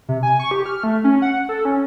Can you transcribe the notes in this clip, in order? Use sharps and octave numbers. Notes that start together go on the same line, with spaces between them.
C3
G#5
C#6
G4
F6
A3
C#4
F#5
A4
C#4